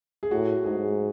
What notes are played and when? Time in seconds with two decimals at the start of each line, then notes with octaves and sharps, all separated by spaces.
0.23 G#4
0.31 A2 F#4
0.64 G#2 G#4